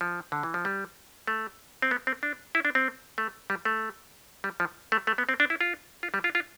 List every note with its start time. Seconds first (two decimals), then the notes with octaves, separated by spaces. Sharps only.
0.01 F3
0.32 D3
0.43 E3
0.54 F3
0.65 G3
1.27 A3
1.82 C4
1.91 B3
2.07 C4
2.23 D4
2.55 E4
2.65 D4
2.75 C4
3.18 A3
3.50 G3
3.65 A3
4.44 G3
4.60 F3
4.92 A3
5.07 A3
5.18 B3
5.29 C4
5.40 D4
5.50 E4
5.61 F4
6.03 F4
6.14 G3
6.24 F4
6.35 F4